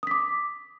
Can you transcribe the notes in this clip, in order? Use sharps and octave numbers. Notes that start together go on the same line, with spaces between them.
D6 D#6 B6